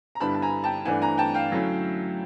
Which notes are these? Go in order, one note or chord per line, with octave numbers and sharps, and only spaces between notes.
A#5
G2 D3 G3 B3 E4 A5 B5
A5
G#5 A#5
G5 A5
G2 E3 A3 D4 F#5 G#5
G#5 A#5
G5 A5
F5 G5
D3 F#3 A3 C#4 E4